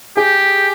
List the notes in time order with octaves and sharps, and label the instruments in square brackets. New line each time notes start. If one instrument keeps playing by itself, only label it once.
[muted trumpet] G4 [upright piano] G#4